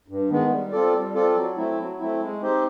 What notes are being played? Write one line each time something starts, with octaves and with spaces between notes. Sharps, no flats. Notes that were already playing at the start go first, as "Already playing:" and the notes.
G2
D#3 G#3 B3
G3
C4 F4 A4 D5
G3
C4 F4 A4 D5
F#3
A3 C4 E4
F#3
A3 C4 E4
G#3
C4 D#4 G4 C5